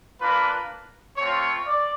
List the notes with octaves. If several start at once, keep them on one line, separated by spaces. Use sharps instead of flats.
A#3 D4 F4 B4
A3 C4 F4 C#5
D5